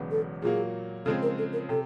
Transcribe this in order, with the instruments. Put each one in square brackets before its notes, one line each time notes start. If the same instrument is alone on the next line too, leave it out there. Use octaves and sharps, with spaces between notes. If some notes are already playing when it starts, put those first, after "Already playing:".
Already playing: [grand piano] E1 E2 C#3 F#3 B3
[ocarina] A4
[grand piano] A#2 F#3 A#3 [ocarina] G#4
[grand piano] C#3 F3 G#3 C4 [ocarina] A4
[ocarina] A#4
A4
A#4
[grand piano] C3 [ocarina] A4